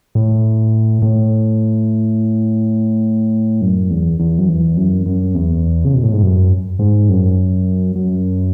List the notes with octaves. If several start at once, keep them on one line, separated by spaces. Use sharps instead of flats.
A2
A2
F#2
E2
E2
F#2
E2
F#2
F#2
E2
C#3
B2
A2
G#2
F#2
G#2
F#2
F#2